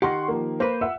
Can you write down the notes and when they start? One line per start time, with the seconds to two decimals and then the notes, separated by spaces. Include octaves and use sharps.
0.02 D#3 G4 F#5 C6 C#6
0.28 F3 A#3
0.60 A#3 B4 C5
0.81 E5 F#5 E6